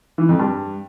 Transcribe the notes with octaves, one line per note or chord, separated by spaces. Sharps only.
E3
F2
G2